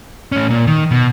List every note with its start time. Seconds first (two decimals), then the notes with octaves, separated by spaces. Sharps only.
0.32 A2 C#4
0.50 A#2
0.67 D#3
0.91 B2